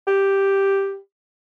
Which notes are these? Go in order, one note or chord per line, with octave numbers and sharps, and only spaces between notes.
G4